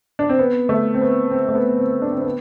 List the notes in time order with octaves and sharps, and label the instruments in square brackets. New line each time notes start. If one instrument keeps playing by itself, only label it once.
[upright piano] D4
C4
B3
A3
C4
B3
C4
A3
B3
C4
D4
C4
B3